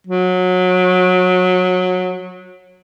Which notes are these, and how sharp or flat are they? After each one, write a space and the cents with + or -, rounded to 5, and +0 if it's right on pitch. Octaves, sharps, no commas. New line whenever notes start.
F#3 -20